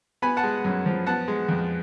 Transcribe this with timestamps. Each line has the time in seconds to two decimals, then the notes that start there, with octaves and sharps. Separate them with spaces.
0.22 B3 G#5 B5
0.37 F#5 A5
0.43 G#3
0.64 F#2
0.86 F3
1.07 B3 F#5 A5
1.28 G#3
1.49 F2